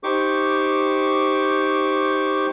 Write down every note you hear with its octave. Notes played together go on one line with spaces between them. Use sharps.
D#4 G4 C5 C#6 D6